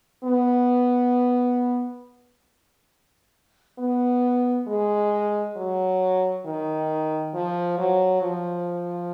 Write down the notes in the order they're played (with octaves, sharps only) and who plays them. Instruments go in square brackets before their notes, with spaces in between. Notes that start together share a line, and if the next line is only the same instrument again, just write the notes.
[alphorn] B3
B3
G#3
F#3
D#3
F3
F#3
F3